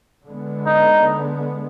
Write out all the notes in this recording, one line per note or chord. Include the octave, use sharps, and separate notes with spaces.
D3 G#3 B3
D#4